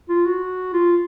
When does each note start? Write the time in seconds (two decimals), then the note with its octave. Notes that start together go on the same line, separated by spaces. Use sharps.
0.09 F4
0.26 F#4
0.74 F4